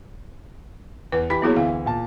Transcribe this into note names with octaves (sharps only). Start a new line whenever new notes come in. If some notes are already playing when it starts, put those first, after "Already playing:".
E2 B4
E3 G4 B5 B6
F#3 A#3 B3 E4 G#4 C#5
D2 E3 F5
A#2 A5